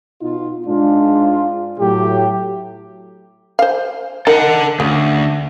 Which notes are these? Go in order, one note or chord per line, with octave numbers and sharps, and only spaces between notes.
B2 D#4 F4
G#2 G#3 D4 F4
A2 F#3 G4
C5 F5
D#4 A4 A#4 F#5
D2 C#3